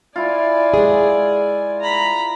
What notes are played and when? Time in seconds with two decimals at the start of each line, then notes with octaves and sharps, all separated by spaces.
0.16 E4 F4 D5 G#5
0.74 G#3 G#4
1.80 A#5 B5